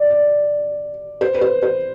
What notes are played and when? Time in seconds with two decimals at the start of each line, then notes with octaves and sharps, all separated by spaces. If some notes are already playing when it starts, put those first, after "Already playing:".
Already playing: D5
0.10 D5
1.21 C5
1.34 B4
1.41 C5
1.63 C5